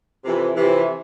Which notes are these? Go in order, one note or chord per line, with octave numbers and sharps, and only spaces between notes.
F2 C3 E3
F2 C3 E3